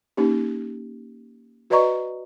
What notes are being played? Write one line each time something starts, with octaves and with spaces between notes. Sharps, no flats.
A#3 C#4 D#4 G4
F#4 B4 D5 D#5 A#5 C#6